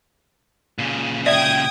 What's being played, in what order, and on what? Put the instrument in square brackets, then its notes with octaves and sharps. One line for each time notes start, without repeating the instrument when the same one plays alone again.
[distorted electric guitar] A#2 C#3
[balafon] D5 E5 [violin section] G5 D#6 G#6